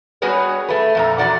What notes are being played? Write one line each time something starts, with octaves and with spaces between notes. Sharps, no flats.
G3 B3 F#4 G#4 B4 C#5
A3 B4
F2 A#2 A#5
E2 F#4 D5 F#5